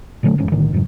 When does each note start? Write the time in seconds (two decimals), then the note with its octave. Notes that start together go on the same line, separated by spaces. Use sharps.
0.23 A#2 D3 F#3 A3
0.38 F1 E2 G#2 C#4
0.52 B1 A2 D3 D#3
0.73 F2 G#2 C#3 F#3